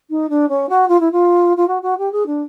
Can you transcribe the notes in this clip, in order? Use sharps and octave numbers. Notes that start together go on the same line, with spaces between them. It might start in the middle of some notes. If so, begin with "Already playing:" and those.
D#4
D4
C#4
F#4
F4
E4
F4
F4
F#4
F#4
G4
G#4
D4